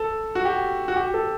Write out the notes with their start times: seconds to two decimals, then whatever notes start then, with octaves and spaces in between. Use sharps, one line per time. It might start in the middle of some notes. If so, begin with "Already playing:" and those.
Already playing: A4
0.35 F#4
0.45 G4
0.88 F#4
0.96 G4
1.14 A4